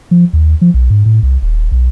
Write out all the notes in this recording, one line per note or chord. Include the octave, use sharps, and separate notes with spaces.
F3
D#2
F3
B1
G#2
A2
C2
D#1
B1